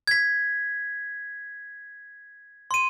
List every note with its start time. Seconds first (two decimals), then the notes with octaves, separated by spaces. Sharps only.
0.07 G#6 B6
2.71 C6 D#7